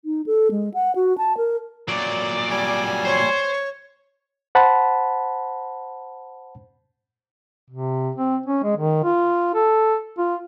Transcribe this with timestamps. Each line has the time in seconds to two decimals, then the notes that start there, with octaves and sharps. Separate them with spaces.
0.05 D#4
0.26 A4
0.51 G#3
0.74 F#5
0.96 F#4
1.18 A5
1.37 A#4
1.88 A#2 F#3 D5
2.51 G3 G#5
3.05 C5 C#5
4.55 C5 F#5 A5 B5
7.70 C3
8.16 C4
8.46 C#4
8.64 G#3
8.77 D#3
9.04 F4
9.55 A4
10.18 F4